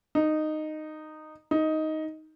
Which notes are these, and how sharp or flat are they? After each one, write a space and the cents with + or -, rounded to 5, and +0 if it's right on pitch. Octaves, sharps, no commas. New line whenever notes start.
D#4 -10
D#4 +10